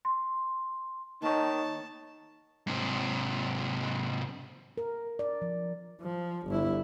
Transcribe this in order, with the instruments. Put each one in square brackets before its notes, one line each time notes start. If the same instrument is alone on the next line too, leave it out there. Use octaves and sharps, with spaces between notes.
[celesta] C6
[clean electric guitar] D#2 C#5 [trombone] D#3 [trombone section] D#4 [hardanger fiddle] A5
[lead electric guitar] G#2 C3
[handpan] A#4
D5
F3
[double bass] F3
G1 E4